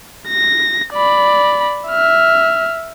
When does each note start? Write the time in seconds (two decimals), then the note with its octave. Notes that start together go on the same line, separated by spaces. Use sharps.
0.28 A#6
0.93 D5 B5
1.89 E5 F6